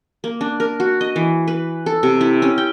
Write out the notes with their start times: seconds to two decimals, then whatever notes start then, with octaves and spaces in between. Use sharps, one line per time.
0.24 A#3
0.41 D4
0.60 A#4
0.80 F#4
1.01 D#5
1.16 E3
1.48 B4
1.86 A4
2.03 C3
2.21 E4
2.42 C#4
2.58 G5